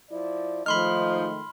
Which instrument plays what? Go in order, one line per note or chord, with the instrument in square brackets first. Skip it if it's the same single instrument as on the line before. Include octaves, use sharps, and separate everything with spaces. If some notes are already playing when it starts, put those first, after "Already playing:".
[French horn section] F3 E4 D5
[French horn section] G#2 D#3 A3 [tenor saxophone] F3 [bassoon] D#4 [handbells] B5 C6 F6